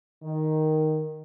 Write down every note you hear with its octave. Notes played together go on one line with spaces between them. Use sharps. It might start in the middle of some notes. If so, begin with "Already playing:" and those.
D#3